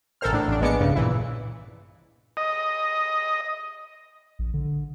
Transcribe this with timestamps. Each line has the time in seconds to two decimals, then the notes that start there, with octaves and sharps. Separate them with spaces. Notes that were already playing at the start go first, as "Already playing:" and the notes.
0.21 A1 A4 A#4 C5 F6
0.33 A2 D4
0.48 A1 D4
0.61 A#1 G#3 B3 D4 D6 C#7
0.80 C2 G2 C#3
0.96 A#2 E3 E4
2.37 D#5
4.39 A#1
4.54 D3